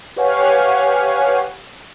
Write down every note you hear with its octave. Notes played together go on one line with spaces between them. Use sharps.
G4 B4 C#5 F5 F#5 G#5